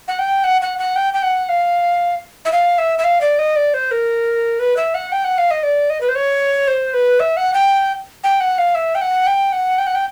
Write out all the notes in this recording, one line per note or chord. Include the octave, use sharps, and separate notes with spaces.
F#5
G5
F#5
F#5
F#5
G5
G5
F#5
F5
E5
F5
E5
E5
F5
D5
D#5
D5
C5
A#4
B4
E5
F#5
G5
F#5
F5
D#5
D5
D#5
B4
C5
C#5
C5
B4
E5
F#5
G5
G5
F#5
F5
E5
G5
F#5
G5
F#5
G5
F#5
G5